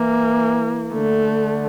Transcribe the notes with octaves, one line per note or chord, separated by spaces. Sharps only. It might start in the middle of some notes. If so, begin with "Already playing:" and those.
Already playing: E3 A#3
D3 A3